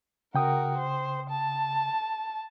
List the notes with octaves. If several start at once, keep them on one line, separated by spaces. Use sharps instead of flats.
C#3 F#4 A#4 G5 D#6
C5
A5